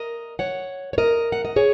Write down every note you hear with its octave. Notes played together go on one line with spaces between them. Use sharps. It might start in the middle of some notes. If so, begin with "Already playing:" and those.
Already playing: A#4 D#5
C#5 F#5
C#5
A#4 D#5
F#5
D#5
G#4 C#5